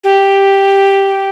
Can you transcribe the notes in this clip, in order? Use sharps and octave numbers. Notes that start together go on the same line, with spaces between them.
G4